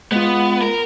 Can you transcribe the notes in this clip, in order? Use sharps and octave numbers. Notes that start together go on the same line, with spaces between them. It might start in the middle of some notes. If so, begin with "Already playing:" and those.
G#3 B3 F4
A#4